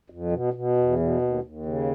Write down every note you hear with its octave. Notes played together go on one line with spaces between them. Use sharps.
F2
B2
B2
E2
B2
D#2
D#2
C#3